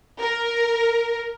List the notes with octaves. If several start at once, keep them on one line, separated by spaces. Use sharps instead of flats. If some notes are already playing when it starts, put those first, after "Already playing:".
A#4